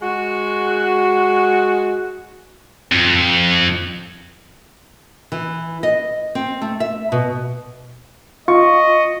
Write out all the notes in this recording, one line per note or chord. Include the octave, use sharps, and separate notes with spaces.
G#3 F#4
F2
E3
D#5
C4
A3
E5
B2
F4 D#5 C#6